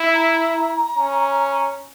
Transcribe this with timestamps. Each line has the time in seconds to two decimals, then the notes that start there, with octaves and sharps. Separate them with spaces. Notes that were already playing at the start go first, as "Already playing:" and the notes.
Already playing: E4
0.13 A#5
0.97 C#4